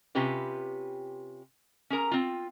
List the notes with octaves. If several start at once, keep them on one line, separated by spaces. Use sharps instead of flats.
C3 C#4 F4 G4 B4
C#4 G#4 A#4 A#5
C4 F4